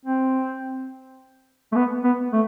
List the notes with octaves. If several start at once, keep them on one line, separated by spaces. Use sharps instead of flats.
C4
A3
B3
B3
A3